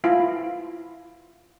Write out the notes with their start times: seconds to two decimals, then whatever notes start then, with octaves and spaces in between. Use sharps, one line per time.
0.04 E4 F4